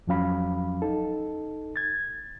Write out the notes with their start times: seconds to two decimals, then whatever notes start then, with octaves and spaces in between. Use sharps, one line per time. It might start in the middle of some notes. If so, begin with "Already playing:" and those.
0.07 F2 F3 F#3 C#4 F5 B5
0.82 D#4 A4
1.76 G#6 A6